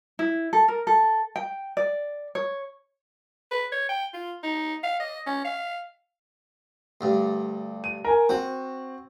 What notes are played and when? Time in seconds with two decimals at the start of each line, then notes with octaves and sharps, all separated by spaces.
0.19 E4
0.53 A4
0.68 A#4
0.87 A4
1.36 G5
1.77 D5
2.35 C#5
3.51 B4
3.72 C#5
3.89 G5
4.14 F4
4.43 D#4
4.83 F5
5.00 D#5
5.27 C#4
5.45 F5
7.01 D2 G2
7.84 D#7
8.05 A#4 G#5
8.29 C4 F#4